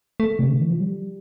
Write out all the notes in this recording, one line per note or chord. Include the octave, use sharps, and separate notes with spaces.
A3
C3
D3
E3
F3
G3